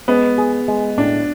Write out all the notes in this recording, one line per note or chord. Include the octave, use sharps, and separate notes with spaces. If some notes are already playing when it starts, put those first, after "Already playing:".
G#3 B3
G#4
G#3
A2 D4